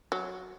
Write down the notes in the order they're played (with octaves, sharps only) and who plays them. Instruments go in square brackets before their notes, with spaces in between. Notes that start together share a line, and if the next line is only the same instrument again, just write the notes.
[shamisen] F#3